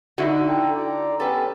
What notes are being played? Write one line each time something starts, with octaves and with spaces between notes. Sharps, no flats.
D3 D#4 E4 F#4
A4 G5 A#5
D5 A#5
B3 C#4 G4 A4 B4